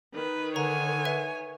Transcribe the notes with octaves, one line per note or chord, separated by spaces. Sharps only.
D#3 B4
D3 B4 C#5 G#5 A#5
B4 E5